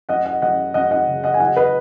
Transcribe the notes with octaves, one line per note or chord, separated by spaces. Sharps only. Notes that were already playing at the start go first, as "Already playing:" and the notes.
F#2 D#5 F#5
D#5 F#5
F#2 D#5 F#5
F#2 D#5 F#5
D#5 F#5
C#3
D#5 F#5
G#5
F#3 D#5 F#5
B4 D#5